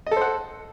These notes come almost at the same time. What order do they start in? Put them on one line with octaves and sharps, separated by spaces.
D#5 A4 C5 F#5